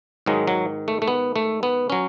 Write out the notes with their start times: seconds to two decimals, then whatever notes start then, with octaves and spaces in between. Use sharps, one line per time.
0.26 G#2 D#3 F#3 G#3
0.47 F#3
0.88 A3
1.02 A3
1.08 B3
1.36 A3
1.63 B3
1.90 F#3 C#4